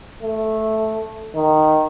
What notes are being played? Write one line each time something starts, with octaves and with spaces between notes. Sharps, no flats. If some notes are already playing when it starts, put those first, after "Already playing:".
A3
D#3